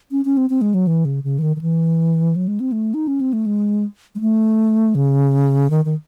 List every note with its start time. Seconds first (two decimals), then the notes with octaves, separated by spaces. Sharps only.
0.11 C#4
0.25 C#4
0.37 C4
0.50 C4
0.61 G#3
0.74 F#3
0.87 E3
1.05 C#3
1.24 C#3
1.39 E3
1.42 D#3
1.56 D#3
1.61 E3
2.36 F#3
2.48 G#3
2.60 C4
2.72 A3
2.94 D#4
3.07 C#4
3.21 C4
3.33 A3
3.46 G#3
4.15 G#3
4.21 A3
4.95 C#3
5.70 D#3
5.85 D#3